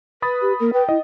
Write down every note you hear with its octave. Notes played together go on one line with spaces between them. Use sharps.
B4 B5 D#6 A6
G4
A#3 A#4
B4 G5
E4 D#5